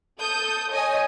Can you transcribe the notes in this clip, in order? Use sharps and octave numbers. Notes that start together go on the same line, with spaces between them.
A4 D#6 G6
C#5 D#5 G#5 D#6